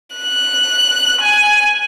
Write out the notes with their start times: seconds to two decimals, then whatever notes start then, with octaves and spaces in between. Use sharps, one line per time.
0.16 F#6
1.20 G#5